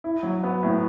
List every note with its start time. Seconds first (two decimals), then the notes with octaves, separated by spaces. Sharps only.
0.04 E4
0.23 F#3
0.43 B3
0.63 A2